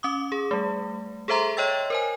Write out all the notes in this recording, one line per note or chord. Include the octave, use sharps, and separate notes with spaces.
C#4 D6 D#6
G#4
G3 A3
G#4 A4 C5 E5 A#5 C6
C#5 D#5 G5 E6 A6
A#4 C5 G#5